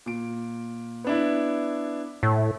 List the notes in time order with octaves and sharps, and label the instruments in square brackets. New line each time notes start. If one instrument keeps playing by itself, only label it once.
[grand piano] A#2 D7
B3 D4 E4
[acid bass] A2